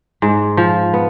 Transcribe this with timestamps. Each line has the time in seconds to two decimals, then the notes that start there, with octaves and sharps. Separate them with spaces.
0.22 G#2
0.57 F3
0.94 B3